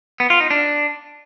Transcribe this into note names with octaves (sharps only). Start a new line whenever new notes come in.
B3
F4
D#4
D4